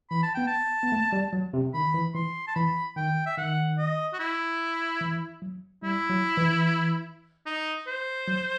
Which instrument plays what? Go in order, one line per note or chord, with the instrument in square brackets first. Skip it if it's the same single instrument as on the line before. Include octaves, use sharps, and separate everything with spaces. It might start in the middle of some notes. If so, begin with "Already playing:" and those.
[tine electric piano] E3 [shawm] B5
[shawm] A5
[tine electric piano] B3 [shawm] G5
[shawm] A5
[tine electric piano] B3
A3
G3
F#3
C3
[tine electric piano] D#3 [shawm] B5
[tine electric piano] E3
[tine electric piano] E3 [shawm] C6
[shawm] A5
[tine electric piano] E3 [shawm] B5
[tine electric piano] D#3 [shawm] G5
[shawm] E5
[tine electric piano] D#3 [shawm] F#5
[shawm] D#5
F#4
E4
[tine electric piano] E3
F#3
[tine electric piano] G3 [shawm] E4
[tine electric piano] F#3
E3
[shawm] D#4
C5
[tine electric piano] F#3